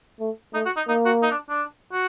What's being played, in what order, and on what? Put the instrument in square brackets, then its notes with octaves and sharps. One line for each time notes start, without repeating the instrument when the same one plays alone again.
[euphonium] A3
[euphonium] A3 [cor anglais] D#4
[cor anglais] F#4
D#4
[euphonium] A#3 [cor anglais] D#4
[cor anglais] F#4
D#4
D4
D4
F#4